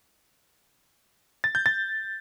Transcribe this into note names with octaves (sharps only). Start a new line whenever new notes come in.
A6
G6
A6